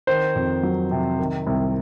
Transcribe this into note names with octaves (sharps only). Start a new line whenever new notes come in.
D#3 C5
F2
F#3
C3
D#3
C2